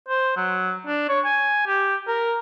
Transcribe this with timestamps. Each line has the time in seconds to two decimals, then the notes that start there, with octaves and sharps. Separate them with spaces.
0.08 C5
0.36 F#3
0.87 D4
1.09 C#5
1.25 G#5
1.67 G4
2.08 A#4